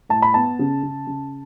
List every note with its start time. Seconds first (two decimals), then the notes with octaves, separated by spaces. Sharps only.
0.09 A2 A5
0.22 B5
0.34 B3 A5
0.59 C#3
0.83 C#3
1.07 C#3